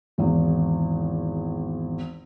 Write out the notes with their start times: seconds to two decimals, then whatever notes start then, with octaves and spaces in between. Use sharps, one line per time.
0.18 G#1 E2